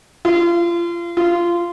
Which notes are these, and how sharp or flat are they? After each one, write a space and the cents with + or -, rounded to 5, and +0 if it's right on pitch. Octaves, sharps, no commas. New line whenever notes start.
F4 -30
F4 -15